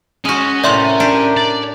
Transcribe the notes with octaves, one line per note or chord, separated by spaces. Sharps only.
G#3 C#4 F#4 G#5
A2 C3 A#4 D5 E5 C6
D4 G4
D5